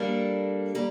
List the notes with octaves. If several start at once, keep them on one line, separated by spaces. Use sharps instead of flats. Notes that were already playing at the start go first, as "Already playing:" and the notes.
Already playing: G3 A#3 D4 A4
G3 A#3